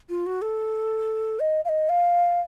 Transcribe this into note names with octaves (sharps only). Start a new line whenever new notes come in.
F4
F#4
A4
D#5
F5
D#5
F5